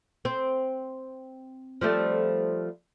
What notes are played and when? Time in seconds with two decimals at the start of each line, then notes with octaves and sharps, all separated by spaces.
0.25 C4
1.81 F3 G3 A3